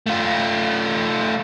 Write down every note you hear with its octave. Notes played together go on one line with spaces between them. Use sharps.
A3 F4